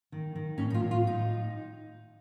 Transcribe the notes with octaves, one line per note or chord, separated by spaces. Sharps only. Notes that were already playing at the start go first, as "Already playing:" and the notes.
D#3
D#3
A2 C#4
D#4
F4
A2
F4
A2
D#4